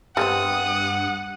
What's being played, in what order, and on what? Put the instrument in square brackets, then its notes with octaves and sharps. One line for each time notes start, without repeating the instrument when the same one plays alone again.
[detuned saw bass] G2 [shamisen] G3 B3 C4 [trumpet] F#5 [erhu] D#6